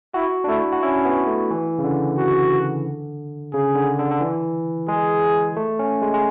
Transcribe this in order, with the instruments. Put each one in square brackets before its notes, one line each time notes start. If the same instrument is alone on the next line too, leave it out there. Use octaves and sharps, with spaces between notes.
[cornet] E4 [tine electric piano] F#4
[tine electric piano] D4
[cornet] A3 [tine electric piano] E4
[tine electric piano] F#4
[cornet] C#4 [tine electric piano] E4
[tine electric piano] B3
A3
E3
C#3
D3
[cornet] F#4
[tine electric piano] C#3 [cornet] G#4
[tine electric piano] D3
D3
D3
E3
[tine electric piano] G#3 [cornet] G#4
[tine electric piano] A3
C#4
G#3
G#3